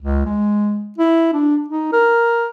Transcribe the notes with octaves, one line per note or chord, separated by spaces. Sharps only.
C#2
G#3
E4
D4
D#4
A#4